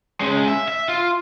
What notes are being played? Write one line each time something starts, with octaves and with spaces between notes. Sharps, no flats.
G#3 C#4
E5
E5
F4